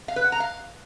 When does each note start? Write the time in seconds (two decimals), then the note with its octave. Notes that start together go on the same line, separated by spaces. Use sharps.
0.08 F5
0.16 B4
0.24 F#5
0.32 A#5
0.40 F5